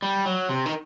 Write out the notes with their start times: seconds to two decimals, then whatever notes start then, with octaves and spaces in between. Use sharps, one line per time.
0.02 G3
0.26 F#3
0.49 C3
0.66 D#3